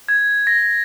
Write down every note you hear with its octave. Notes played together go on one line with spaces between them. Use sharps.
G#6
A#6